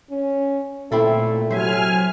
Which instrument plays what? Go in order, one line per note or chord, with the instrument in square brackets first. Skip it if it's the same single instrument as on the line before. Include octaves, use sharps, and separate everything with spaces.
[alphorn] C#4
[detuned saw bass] A#2 [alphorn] A3 [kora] C4 E4 A4
[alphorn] C3 [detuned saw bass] F#3 [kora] C5 E5 [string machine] G#5 F6